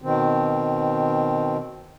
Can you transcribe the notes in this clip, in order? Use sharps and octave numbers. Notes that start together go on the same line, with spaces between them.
B2 D#3 C4